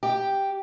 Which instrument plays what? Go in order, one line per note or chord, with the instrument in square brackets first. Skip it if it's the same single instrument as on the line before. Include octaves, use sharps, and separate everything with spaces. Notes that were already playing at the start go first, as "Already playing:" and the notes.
[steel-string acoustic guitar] G4